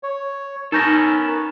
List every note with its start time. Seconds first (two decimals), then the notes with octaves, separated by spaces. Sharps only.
0.03 C#5
0.72 B3 C#4 D#4 A4 A#4 G6 A#6